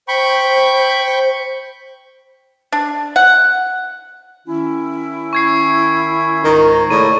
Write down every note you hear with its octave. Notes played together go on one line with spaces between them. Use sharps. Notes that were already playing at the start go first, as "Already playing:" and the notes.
C5 G5 B5 C#6
D4
F#5
D#3 C#4 E4
C#6 G#6 C7
C#2 G#2 D#3 A#5
A2 C#3 A#3 D5 C#6 D#7